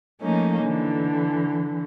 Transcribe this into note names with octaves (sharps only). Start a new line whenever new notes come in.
F3 A3 A#3 C#4 D#4
D3 E3